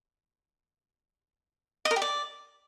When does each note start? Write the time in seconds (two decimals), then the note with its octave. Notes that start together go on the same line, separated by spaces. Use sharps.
1.85 D#5
1.91 A#4
1.96 G4
2.02 D5